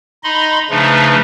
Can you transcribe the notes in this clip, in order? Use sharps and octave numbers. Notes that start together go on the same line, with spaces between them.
D#4 D#5 B5 C6
C#3 F3 A3 D4 D#4 B4